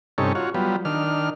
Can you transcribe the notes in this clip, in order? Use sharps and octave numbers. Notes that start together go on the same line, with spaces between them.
G2 C3 C#4 D#4 A4 C#5
F4 F#4 C#5
F#3 G3 B3 F4
D#3 D4 F6